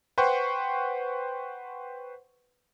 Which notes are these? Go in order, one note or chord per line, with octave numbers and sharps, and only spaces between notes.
B4 C5 F#5 G5 C6 C#6